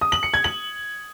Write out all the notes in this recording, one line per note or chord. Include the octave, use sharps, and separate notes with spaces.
D#6
F#7
C#7
G#6
F#7